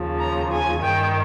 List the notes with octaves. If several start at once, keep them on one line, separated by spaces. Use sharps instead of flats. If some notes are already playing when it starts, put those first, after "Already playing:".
Already playing: D#2 C#3 F3
A#5
G#5
G2 D#3 G5